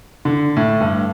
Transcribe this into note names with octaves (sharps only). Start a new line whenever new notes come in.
D3
A2
G2